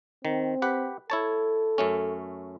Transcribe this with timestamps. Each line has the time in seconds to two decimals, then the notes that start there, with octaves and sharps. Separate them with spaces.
0.25 D#3 C4
0.62 G4 B4 F#5
1.10 E4 A4 C#5 A5
1.78 F#2 A3 C#4